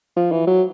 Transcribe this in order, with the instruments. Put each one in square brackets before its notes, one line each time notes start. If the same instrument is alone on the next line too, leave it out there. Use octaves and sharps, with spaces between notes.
[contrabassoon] F3
E3
F#3